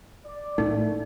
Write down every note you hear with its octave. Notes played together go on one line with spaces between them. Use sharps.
D5
A2 A3 D#4